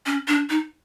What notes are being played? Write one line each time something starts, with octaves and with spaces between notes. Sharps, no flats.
C#4
D4
D#4